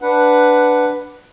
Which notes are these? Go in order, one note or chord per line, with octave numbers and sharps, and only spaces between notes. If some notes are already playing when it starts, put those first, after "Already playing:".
D4 B4 F#5